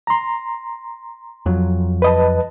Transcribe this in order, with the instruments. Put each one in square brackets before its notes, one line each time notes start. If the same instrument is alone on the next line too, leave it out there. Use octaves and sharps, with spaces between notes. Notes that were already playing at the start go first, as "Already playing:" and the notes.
[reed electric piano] A#5 C6
[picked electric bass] F2 F#3
[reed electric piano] B4 D#5 A5